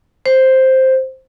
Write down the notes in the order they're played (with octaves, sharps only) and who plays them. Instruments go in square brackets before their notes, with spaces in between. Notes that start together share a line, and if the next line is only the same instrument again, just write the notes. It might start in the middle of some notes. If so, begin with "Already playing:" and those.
[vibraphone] C5